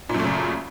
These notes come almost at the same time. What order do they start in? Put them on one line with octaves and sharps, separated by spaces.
A#2 F#2 A3 C#3